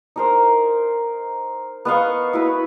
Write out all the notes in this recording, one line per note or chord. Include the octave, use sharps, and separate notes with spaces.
D#4 A#4 C5
B3 D#5 F5 C#6
E4 F#4 B4